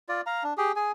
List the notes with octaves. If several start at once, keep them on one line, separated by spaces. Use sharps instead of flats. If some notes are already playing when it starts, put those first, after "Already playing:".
F4 D5
F5 A#5
D4
G4 G#4
G#4 G#5